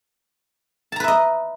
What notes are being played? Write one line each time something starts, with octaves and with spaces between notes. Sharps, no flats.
B4 D#5 E5 A5 A#5